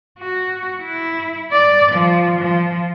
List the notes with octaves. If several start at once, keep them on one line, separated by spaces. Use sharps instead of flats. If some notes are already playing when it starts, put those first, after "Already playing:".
F#4
E4
D5
F3
F3